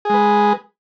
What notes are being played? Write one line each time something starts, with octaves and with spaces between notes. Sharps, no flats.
G#3 G#4 B4